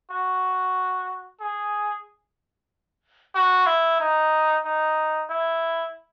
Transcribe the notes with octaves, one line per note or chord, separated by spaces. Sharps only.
F#4
G#4
F#4
E4
D#4
D#4
E4